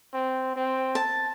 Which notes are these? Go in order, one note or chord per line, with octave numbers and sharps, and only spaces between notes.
C4
C4
A5